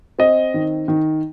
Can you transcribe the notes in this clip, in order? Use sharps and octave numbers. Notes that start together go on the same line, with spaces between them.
C4 D#5
D#3
D#3